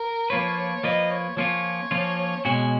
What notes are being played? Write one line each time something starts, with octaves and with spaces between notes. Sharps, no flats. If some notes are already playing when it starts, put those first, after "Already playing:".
Already playing: A#4
F3 A#3 F4 B4 C#5
F3 A#3 F4 B4 D#5
C#5
F3 A#3 C#4 F4 C#5
F3 A#3 C#4 F4
B2 G#3 C#4 F#4 G#5